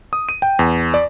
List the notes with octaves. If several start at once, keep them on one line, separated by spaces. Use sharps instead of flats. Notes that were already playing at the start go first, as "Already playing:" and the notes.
D#6
D#7
G5
E2
D5